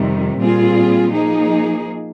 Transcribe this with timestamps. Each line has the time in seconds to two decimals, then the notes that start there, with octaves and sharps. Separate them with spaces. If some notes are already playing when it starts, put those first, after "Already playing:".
Already playing: F2 C3 D#3 G3
0.38 A#2 G3 C4 F4 G#4
1.12 F3 A#3 D#4 G#4